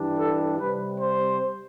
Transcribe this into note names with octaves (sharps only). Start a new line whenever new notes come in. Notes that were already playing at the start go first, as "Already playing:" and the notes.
Already playing: G2 E3 G3 D4
A4
C3 G3 C4 B4
C5